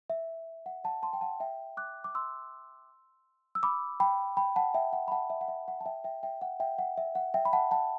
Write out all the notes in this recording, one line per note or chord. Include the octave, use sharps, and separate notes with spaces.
E5
F#5
F#5 A5
A5 C6
G5
F#5 A5
E5 G5
D6 F#6
D6
C6 E6
E6
B5 D6
G5 B5
G5 B5
F#5 A5
E5 G5
F#5
B5
F#5 A5
E5
F#5
E5
F#5
A5
E5 G5
E5 G5
E5 G5
F#5
E5 G5
F#5
E5
F#5
E5 G5
B5
F#5 A5
F#5 A5